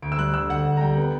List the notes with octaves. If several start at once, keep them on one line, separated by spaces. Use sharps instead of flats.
D2 D7
E6
G3 F#6
D3 E6
D2 F#5
D2
A#5
G3 G5
B3